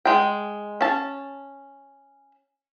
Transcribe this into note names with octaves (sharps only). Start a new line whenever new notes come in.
G#3 G5
C#4 A5